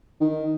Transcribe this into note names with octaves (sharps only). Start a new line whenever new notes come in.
D#3